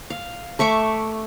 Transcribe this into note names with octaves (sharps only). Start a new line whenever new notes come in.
F5
A3 E5 C#6 D6